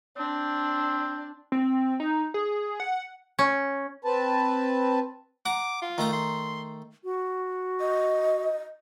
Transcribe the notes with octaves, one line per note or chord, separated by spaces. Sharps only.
C4 D4
C4
D#4
G#4
F#5
C#4
C4 B4 A5
F#5 A#5 D6
F4
D#3 A3 A#5
C6
F#4
D#5